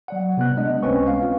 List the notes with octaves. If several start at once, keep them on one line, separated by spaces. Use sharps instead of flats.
F#3 D5 F#5
C3 B3 F#6
G#3 D4 D#5
C#2 G#3 C4 C#4 B4 C#6
F5
F4